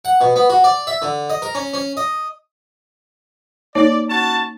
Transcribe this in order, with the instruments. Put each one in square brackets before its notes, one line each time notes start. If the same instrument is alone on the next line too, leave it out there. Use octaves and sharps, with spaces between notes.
[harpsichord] F#5
B2
B3
F#4
D5
E5
D3
D#5
A#4
C#4
C#4
D#5
[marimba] A#3 D#4 C#5 [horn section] D5
[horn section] C#4 F#4 A5